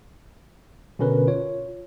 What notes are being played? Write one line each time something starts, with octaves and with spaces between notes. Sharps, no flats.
B2 D3 C#4 A#4 B4
F4 C#5